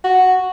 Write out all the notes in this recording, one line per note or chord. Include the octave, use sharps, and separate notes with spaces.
F#4